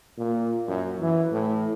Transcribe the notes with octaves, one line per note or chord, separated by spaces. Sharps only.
A#2
F#2
E3
A2